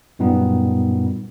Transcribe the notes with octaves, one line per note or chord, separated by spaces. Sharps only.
F#2 A#2 G3 B3 D#4